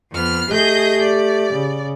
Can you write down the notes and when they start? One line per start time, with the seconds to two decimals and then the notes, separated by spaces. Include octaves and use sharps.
0.12 F2 B3 F6
0.49 A3 G4 G#4 D#5 G6
1.01 D5
1.53 C#3